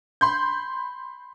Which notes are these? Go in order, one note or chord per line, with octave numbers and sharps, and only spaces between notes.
B5 C6 G6